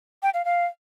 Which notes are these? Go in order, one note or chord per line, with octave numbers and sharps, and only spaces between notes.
G5
F5
F5